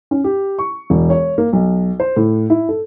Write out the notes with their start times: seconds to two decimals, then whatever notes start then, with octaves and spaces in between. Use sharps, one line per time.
0.11 C#4
0.24 G4
0.59 C#6
0.90 E1
1.10 C#5
1.38 A#3
1.53 B1
2.00 C5
2.16 A2
2.50 E4
2.69 A4